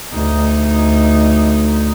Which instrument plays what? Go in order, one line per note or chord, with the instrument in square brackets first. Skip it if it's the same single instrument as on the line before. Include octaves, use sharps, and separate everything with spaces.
[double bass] D2 D#4